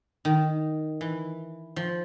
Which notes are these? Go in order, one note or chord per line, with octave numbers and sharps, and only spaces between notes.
D#3
E3
F3